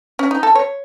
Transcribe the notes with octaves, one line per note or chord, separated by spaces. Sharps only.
C#4
D#4
A4
C#5